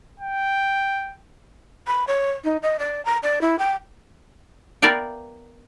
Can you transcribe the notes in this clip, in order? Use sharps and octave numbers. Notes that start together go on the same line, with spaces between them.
G5
B5
C#5
D#4
D#5
D5
A#5
D5
E4
G5
B3 A#4 D5 E5 F5 G5